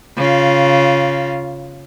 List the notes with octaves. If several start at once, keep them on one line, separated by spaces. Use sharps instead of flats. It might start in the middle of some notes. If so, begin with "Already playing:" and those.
C#3 F4